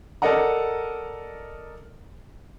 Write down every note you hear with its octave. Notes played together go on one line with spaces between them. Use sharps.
A4 A#4 D5 D#5 F#5 A#5